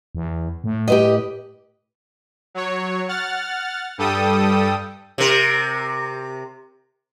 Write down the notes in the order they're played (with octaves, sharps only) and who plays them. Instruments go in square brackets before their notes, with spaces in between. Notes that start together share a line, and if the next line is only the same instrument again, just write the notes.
[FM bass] E2
A2
[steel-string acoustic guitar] G4 B4 D#5
[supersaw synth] F#3 C#5
F#5 F6 A6
G2 G3 A4 G5 D#6
[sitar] C3 A#4